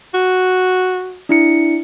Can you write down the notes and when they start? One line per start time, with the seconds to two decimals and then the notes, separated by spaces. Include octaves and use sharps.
0.14 F#4
1.29 D4 E4 C#7